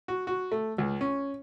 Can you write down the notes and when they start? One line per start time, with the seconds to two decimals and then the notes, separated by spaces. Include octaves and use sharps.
0.08 F#4
0.27 F#4
0.52 A3
0.78 C#2
1.01 C#4